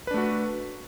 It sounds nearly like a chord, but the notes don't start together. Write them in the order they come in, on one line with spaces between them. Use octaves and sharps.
B4 D4 A3 F#4